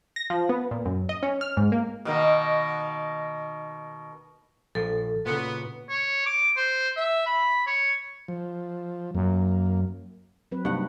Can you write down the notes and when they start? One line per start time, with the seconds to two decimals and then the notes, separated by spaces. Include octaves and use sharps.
0.16 A#6
0.30 F3
0.49 B3
0.71 A#2
0.85 F#2
1.09 D#5
1.23 C#4
1.41 F6
1.57 G#2
1.72 A#3
2.05 B2 D#3 A#3
4.75 A#1 F3 A4
5.26 A#2 C#3 B3
5.89 C#5
6.26 D6
6.57 C5
6.96 E5
7.26 B5
7.67 C#5
8.28 F3
9.15 F#2 A#3
10.52 F#3 C4 B4
10.65 G2 C3 A#3 D#4 F#5